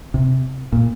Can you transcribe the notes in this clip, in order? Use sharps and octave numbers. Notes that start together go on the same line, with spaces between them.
C3
A#2